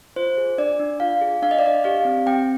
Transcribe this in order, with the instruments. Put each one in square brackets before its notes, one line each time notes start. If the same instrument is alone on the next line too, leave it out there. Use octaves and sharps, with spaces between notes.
[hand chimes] F4 C5
G#4
D4 D5
D4
F4 F5
G#4
D4 F5
D#5
D5
D4 D#5
G4 F5
C4
C4 G5